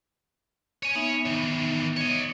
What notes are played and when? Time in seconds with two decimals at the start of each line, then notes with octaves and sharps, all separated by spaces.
0.83 C#5 G#5
0.95 B3 D#4 E5
1.26 D#3 E3
1.97 C#5 D#5